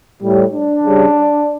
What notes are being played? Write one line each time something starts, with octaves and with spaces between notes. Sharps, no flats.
A2 G3
D4
C#3 G3